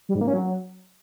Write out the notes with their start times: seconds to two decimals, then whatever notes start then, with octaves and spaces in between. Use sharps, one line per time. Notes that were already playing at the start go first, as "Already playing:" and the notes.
0.09 G3
0.15 G#2
0.21 A#3
0.27 C#4
0.34 F#3